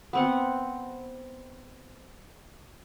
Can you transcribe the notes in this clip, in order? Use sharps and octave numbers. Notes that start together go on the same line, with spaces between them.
B3 C4 F#5